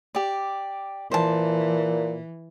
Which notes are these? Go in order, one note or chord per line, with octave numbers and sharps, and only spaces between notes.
G4 D5
A#2 E3 C5 A5